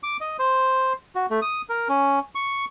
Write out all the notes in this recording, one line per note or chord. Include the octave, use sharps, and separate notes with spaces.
D6
D#5
C5
F#4
A3
D#6
A#4
C#4
C#6